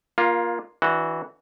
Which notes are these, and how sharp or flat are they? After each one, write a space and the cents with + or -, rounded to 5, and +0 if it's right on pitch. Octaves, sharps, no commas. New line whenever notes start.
A#3 +20 F4 +0
E3 -15 D4 +10 F#4 +0